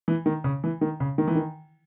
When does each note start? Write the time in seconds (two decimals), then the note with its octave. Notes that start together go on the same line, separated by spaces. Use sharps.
0.08 E3
0.26 D#3
0.44 C#3
0.64 E3
0.81 D#3
1.00 C#3
1.18 D#3
1.28 E3
1.35 D#3